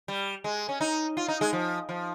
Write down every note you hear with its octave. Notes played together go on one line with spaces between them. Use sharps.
G3
G#3
C#4
D#4
F4
D#4
G#3
F3
F3